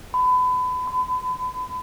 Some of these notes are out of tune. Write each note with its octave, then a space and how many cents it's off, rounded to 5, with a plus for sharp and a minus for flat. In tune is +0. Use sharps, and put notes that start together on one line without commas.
B5 +30
B5 +40